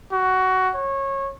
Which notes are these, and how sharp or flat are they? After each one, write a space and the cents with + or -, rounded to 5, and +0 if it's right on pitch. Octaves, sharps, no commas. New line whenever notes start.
F#4 +15
C#5 -20